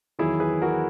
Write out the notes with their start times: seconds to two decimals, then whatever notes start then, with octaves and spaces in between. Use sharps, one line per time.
0.19 E2 D#3 F#3 E4 G#4
0.40 G#4 B4
0.62 F#4 A#4